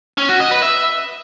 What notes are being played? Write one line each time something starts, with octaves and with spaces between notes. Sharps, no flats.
C#4
F#4
D#5
B4
E5